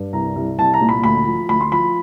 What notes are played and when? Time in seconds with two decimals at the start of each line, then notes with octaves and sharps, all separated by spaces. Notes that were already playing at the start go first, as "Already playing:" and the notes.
Already playing: G2
0.13 C2 A#5
0.36 C2
0.58 C2 A5
0.74 A#5
0.81 A#2
0.89 B5
1.04 D2 B5
1.26 F3
1.49 D2 B5
1.61 C6
1.71 F3 B5